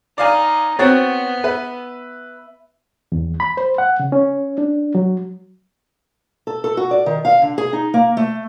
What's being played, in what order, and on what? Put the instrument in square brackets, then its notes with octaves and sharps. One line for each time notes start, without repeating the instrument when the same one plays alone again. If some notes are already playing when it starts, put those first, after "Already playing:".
[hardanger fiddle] D#4 [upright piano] D5 F5 G#5
[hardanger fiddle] B3 [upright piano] C4 F#4 C#5 [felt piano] C5 A6
[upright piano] B4 [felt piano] E5
[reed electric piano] E2
B5
C5
F#5
C#3
C#4
D4
F#3
[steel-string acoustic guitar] A4
A4
F#4
D5
D#3
F5
D3
G#4
D#4
A#3
A3